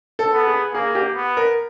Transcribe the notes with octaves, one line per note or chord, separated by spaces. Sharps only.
A4
B3
G#4
A#3 G#4
G4
B3
A#4